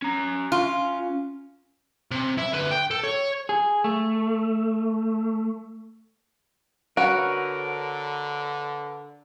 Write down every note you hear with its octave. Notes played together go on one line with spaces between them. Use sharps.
C#4 A#5
F4
C3
E4 E5
D3 B4
G5
A4
C#5
G#4
A3
D3 F#4 A#4 B4 C#5